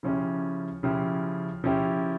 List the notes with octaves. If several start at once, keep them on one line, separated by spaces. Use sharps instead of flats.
C#3 F3 C#4 E4 G4
C#3 F3 C#4 E4 G4
C#3 F3 C#4 E4 G4